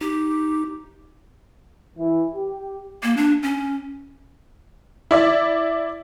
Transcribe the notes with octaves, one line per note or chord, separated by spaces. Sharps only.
D#4 G4
E3
G4
A#3
D4
C#4
E4 D5 E5